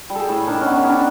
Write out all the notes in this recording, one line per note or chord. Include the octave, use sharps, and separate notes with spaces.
G3
G#4 A4
A2
D#3 D4
C#4
B3
C#4
D#3 D4